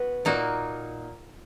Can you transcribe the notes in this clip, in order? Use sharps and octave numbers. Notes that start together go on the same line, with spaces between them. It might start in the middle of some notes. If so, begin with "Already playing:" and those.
Already playing: B3 F#4 B4
A#2 A#3 D#4 F#4